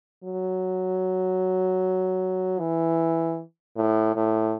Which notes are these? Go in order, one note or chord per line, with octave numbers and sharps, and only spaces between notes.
F#3
E3
A2
A2